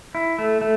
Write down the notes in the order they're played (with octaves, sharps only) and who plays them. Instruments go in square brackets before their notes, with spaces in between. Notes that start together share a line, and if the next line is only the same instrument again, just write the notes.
[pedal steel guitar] E4
A3
A3